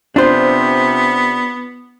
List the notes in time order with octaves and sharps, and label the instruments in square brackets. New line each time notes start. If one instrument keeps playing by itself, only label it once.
[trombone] C3 [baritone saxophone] B3 [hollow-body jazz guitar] D4 F4 C5